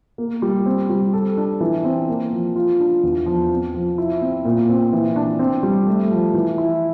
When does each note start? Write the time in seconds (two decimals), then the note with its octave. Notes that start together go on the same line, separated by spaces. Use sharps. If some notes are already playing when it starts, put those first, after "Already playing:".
0.18 A#3
0.42 G3
0.66 C4
0.90 G3
1.14 A4
1.38 D4
1.60 E3
1.85 C4
2.09 A#3
2.33 F3
2.56 F4
2.80 D4
3.03 E2
3.26 F3
3.51 C4
3.75 F3
3.98 E4
4.22 C4
4.45 A#2
4.69 C4
4.93 E3
5.16 D4
5.39 C4
5.63 G3
5.87 A3
6.11 F3
6.34 E3
6.58 E4